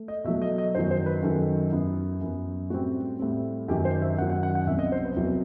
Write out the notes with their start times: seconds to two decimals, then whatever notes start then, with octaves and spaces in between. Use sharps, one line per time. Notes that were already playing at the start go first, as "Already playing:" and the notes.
Already playing: A3
0.08 D#5
0.24 B2 F#3 A3 E5
0.42 D#5
0.58 D#5
0.75 F#2 D#3 F#3 C5
0.91 C5
1.06 B4
1.23 F#2 D#3 F#3 A4
1.72 F#2 F#3 B3
2.21 F#2 F#3 B3
2.70 A2 G3 C4 F#4
3.19 A2 G3 C4
3.68 F#2 D#3 F#3 G4
3.85 C5
4.02 E5
4.18 F#2 D#3 F#3 F#5
4.30 F#5
4.43 F#5
4.55 F#5
4.67 C2 B2 F#3 E5
4.79 D#5
4.92 C5
5.04 B4
5.16 C2 B2 F#3